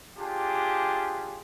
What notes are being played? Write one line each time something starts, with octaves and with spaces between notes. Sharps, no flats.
D4 F4 G4 G#4